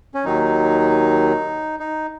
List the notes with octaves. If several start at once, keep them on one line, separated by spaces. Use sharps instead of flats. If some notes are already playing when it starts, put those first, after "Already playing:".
C#4
D#2 D#3 F#3 D#4
D#4